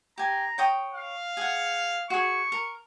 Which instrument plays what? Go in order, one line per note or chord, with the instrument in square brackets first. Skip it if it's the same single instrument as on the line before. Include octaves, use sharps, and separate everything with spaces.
[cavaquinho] G4 G#5 [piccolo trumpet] A#5
[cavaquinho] C#5 G5 D#6
[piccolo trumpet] F5
[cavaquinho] G#4 F#5
[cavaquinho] F#4 G#4 [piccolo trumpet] C#6
[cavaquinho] A#4